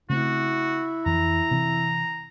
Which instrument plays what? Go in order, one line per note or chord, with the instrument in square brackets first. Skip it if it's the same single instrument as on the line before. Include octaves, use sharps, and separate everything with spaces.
[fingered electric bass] C#3 A3 C4 [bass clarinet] E4 [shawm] F#4
[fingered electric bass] F2 E3 [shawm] A#5
[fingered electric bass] C3 E3